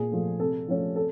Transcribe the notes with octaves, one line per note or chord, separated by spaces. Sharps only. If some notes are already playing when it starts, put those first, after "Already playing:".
Already playing: A#2 G#4
F3 A3
C3 A4
F3 A3 C#4
A4